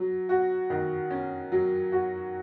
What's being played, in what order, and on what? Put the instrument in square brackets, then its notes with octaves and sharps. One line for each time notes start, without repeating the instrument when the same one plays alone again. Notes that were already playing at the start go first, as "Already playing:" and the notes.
Already playing: [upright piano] F#3
F#4
D#3
C#4
F#3
F#4